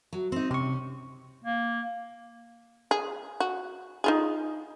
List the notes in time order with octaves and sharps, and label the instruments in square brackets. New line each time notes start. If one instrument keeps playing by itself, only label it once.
[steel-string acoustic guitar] F#3
C4 D#4
[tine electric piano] C3 C#6 [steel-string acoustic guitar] C#4
[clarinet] A#3
[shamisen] G#4
F#4
D#4 F4 G#4